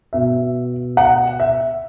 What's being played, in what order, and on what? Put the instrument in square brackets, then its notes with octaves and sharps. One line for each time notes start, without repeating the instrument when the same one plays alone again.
[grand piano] B2 E5
F#5
E5